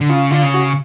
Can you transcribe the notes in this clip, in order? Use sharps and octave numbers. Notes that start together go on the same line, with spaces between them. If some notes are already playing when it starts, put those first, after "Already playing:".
D3
C#3 F4
D3 F4
C#3
F#4